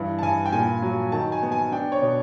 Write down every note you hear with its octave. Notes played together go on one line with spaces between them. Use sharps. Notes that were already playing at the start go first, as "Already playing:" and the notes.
Already playing: G2 E3
A5
G2 G#5
G5
A#2 G#5
F#3
D#3 A5
G#5
B3
G#5
D4 G5
C#5
B2